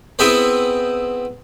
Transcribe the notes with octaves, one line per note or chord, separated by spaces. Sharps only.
B3 C4 E4 G#4 B4 C5